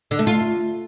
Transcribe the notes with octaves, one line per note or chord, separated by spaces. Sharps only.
D3
A3
F4